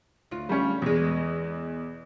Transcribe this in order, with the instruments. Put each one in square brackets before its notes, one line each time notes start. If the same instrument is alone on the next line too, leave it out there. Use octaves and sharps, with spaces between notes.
[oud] D2 F4
[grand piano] G3 C#4
[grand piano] E2 [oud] B2 G#3